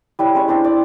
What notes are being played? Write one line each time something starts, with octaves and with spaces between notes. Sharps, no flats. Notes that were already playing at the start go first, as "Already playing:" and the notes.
G3 E4 B4 C#5
G#3 C#4 C#5
C4 D4 C5
D5